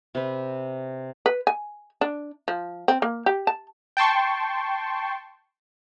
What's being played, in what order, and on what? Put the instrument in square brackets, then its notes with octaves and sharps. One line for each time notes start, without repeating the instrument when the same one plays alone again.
[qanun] C3 B4
[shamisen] B4
G#5
D4
F3
C4
A#3
G4
A5
[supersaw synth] G5 A5 C6 C#6